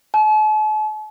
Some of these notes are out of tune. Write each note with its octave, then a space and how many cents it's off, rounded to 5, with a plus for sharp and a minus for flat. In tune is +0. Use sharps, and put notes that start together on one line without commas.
A5 -45